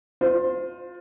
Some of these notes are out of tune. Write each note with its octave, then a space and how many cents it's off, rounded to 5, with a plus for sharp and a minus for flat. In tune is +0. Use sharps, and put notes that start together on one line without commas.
F4 +20 C5 -25